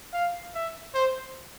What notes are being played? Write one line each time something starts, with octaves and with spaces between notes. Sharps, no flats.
F5
E5
C5